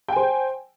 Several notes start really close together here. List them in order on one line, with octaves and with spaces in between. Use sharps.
G5 G#5 C5